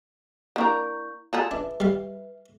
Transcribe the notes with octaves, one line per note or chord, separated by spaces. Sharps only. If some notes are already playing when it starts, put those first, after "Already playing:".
A#3 D4 E4 A#4 C#6 G6
F4 G#4 A4 E7
D4 B4 E5
G3 F5